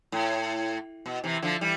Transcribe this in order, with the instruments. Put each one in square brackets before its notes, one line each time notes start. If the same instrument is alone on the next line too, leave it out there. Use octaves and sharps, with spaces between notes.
[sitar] A2
B2
C3 E3
D3 F3
E3 G3